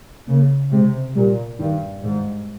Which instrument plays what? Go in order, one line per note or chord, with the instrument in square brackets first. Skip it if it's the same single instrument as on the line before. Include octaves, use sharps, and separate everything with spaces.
[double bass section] C#3 [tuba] A#3
[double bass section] C3 [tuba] G#3
[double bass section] A#2 [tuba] G3
[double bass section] G2 [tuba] D#3
[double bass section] G#2 [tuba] D#3